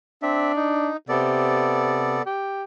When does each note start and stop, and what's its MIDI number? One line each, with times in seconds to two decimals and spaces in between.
0.22 0.52 60
0.22 0.90 62
0.22 0.52 76
0.56 0.97 63
1.09 2.18 48
1.09 2.22 59
1.09 2.22 69
1.09 2.22 74
2.26 2.63 67